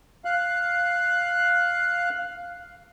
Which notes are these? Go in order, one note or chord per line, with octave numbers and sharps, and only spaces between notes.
F5 F#6